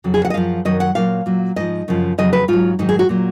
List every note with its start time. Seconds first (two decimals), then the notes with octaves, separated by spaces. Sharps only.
0.04 F2 C#3 F#3
0.14 G#4
0.25 F#5
0.30 D#5
0.34 F#2 F3 F5
0.65 F#2 D#3 F#3 D#5
0.80 F#5
0.95 A#2 F#3 F5
1.26 A#2 F#3
1.56 G#2 F3 D#5
1.88 F#2 C#3 F3
2.18 F2 C#3 F#3 D#5
2.33 B4
2.48 G#2 F#3 F4
2.79 G#2 D#3 F#3 D#4
2.89 G#4
2.99 F#4
3.09 A#2 F#3